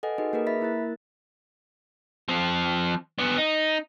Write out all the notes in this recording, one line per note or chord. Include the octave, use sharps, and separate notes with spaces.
A4 B4 D#5 F#5 G#5
D#4 F#4 G#4 B4 D#5
A#3 G#4 A#4 B4
E5 B5 A6 B6
A#3 E4 A#4 F#6 A6
F3 C4
B3 D4
D#4